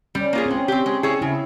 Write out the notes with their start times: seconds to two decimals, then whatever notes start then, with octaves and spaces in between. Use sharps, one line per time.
0.15 G3 C#4
0.33 A#3 F4 G#4
0.46 C4
0.51 G#3 C#4
0.68 C4 G4
0.86 G#3
1.03 E4 G#4 C#5
1.22 C#3 E4